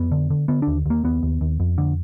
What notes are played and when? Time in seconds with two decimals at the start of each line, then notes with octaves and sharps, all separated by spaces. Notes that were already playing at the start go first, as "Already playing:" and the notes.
Already playing: F2 B3
0.12 D3
0.30 D3
0.48 D3 B3
0.62 D4
0.67 D#2
0.86 D#2 A#3
1.04 D#2 B3
1.23 D#2
1.41 D#2
1.60 F2
1.78 D3